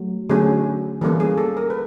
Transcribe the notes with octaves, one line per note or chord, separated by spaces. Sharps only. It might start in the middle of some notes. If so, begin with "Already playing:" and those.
Already playing: F#3 A3
D3 F#3 A3 C#4 G#4
E3 G3 A#3 C#4 A4
G#4
A4
A#4
B4